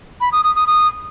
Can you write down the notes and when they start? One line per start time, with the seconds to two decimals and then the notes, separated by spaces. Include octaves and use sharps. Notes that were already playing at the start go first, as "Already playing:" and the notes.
0.21 B5
0.32 D#6
0.44 D#6
0.55 D#6
0.67 D#6